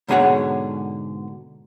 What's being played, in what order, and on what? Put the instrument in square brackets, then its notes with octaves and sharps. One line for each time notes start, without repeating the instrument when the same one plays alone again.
[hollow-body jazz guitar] G#2 B2 D3 G#4 C#5 F#5